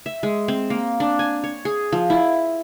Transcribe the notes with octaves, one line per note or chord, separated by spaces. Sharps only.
E5
G#3
C4
A#3
D4
G#5
C#5
G#4
F3
E4